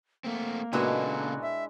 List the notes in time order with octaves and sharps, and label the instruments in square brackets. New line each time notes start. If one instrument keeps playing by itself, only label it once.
[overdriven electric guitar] A3 C4 [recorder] A#3
[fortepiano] A#2 B3 F#4 [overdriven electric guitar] C#3 A4 [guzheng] G#3 D4 E4
[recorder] E5